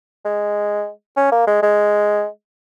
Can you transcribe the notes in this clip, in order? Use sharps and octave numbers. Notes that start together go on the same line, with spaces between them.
G#3
C#4
A#3
G#3
G#3